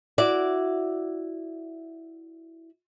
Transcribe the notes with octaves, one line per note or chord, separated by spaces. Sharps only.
E4 F#4 D5